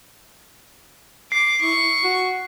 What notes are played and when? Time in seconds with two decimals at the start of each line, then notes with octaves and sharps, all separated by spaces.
1.32 D6 C7
1.61 E4 C#6
2.04 F#4